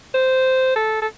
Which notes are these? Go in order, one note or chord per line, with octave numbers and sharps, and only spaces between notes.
C5
A4
A4